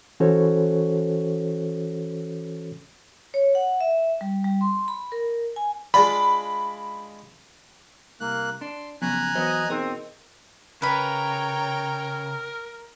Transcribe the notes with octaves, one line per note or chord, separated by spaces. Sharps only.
E3 C#4 F#4 A4 C5 C#5
C#5
F#5
E5
G3
G3
C6
B5
A#4
G#5
G#3 D4 F4 B5
C2 A#3 F#6
D4 C6
F2 C#3 F#3 B3 G#5 A#5 F#6
E3 F#3 B3 C5 D#5
B2 C4 D#4 G#4 A#4 D#5
C#3 A#4 B4 C#5 G5 A#5 B5